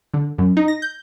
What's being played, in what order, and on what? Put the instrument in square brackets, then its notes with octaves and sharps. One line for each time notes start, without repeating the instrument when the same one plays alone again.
[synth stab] D3
F#2
D#4
A#6
G6